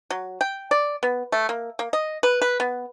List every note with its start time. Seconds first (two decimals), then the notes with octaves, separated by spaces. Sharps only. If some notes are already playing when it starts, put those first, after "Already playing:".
0.10 F#3
0.41 G5
0.71 D5
1.03 B3
1.32 A3
1.49 A#3
1.79 A#3
1.93 D#5
2.23 B4
2.42 B4
2.60 B3